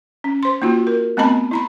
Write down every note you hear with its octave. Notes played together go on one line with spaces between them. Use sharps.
C#4
C5 C6
A#3 D#4 F4 F#4
A#4
A3 B3 C4 D#5 A5 B5
E4 A#5 B5